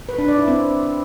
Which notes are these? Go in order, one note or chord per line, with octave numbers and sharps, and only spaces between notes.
B4
D4
D5
E4
C4